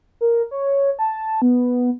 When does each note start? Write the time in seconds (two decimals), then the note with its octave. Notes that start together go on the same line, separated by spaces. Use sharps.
0.21 A#4
0.51 C#5
0.99 A5
1.42 B3